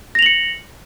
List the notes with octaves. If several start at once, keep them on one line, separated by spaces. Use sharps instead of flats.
A#6 C#7 F7 F#7